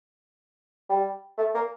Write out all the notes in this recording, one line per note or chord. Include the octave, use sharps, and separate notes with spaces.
G3
A3
A#3